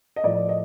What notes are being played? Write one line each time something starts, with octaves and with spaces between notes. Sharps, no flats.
D#5
A2 F3 D5
D#5